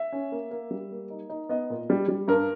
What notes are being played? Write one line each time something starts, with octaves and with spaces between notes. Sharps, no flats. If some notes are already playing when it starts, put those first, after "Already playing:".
Already playing: E5
C#4
A#3
A#3
G3
A#3
D#4
D#4
B3 D#5
A#2
G3
G3
G2 A#4